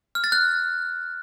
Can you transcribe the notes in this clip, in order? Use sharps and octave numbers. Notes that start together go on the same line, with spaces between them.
F6
A6
F#6